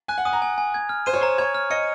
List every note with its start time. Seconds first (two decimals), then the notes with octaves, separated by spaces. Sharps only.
0.08 G#5 F#6
0.18 F#5
0.25 G#5 D#6
0.33 A#5
0.42 G#5
0.58 G#5
0.74 G#6
0.89 F6
1.06 C5 D#7
1.13 C#5
1.21 C5 A#5
1.38 C#5 G#6
1.55 F6
1.70 D#5 C#7